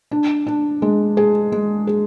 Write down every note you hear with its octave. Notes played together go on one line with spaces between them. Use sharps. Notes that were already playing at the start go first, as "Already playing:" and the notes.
D4
D4
G#3
G#4
G#3
G#4